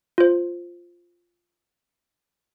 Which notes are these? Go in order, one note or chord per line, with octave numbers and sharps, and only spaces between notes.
F4 C5